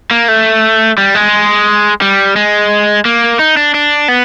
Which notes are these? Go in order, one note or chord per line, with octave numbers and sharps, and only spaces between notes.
A#3
A3
G3
G#3
G3
G#3
A#3
D#4
D4
D4
B3